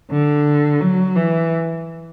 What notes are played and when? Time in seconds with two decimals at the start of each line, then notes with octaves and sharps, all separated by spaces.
0.11 D3
0.81 F#3
1.16 E3